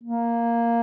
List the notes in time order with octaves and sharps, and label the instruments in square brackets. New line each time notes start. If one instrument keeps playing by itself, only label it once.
[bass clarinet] A#3